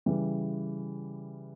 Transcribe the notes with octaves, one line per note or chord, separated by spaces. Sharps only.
C#3 E3 G3